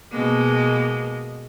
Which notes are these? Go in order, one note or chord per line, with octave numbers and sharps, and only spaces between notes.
B2 G#3 A#3